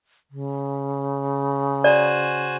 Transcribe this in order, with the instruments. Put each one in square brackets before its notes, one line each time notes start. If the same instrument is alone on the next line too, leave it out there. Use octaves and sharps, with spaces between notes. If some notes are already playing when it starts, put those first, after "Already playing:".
[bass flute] C#3
[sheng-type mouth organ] F#4 C5 G#5 [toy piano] D5